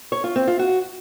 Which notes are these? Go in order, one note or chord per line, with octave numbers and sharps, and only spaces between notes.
C#5
F4
C4
F4
F#4